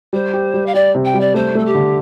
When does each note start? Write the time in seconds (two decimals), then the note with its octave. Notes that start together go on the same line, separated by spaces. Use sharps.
0.13 G3 C5
0.33 G4
0.54 G3
0.66 F5
0.74 G4 D5
0.95 C3
1.05 G5
1.14 G3
1.20 D5
1.34 A3 C5
1.55 A3 A4
1.65 G4
1.75 D3